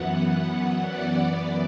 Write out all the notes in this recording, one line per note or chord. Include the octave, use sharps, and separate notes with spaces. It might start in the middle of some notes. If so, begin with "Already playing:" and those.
Already playing: F#2 E3 B3 F#5
D5
F#2 E3 B3